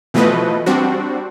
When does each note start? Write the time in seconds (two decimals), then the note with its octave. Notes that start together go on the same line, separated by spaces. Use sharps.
0.14 B2 E3 F3 A3 B4 D#5
0.66 G3 C4 D4 F#4